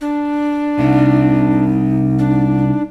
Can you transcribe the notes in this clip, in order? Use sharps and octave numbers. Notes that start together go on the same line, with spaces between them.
D4
C2 C3 D#4
D4